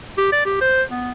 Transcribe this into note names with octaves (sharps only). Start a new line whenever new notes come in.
G4
D5
G4
C5
B3